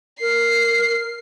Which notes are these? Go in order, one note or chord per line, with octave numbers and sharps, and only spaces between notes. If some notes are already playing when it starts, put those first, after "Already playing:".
A#4 C7